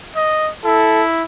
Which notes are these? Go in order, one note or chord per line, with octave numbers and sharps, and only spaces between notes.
D#5
E4 A4